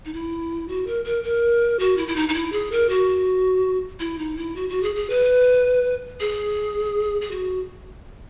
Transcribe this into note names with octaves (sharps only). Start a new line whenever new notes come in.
D#4
E4
F#4
A#4
A#4
A#4
F#4
E4
E4
D#4
D#4
E4
G#4
A#4
F#4
E4
D#4
E4
F#4
F#4
G#4
G#4
B4
G#4
G#4
F#4